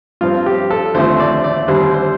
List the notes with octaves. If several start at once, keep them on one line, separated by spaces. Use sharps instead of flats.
G2 F3 C4 F4
G4
A4
D#2 D3 F3 A3 C4 C5
D5
D5
D#2 D3 G3 C4 C5
C5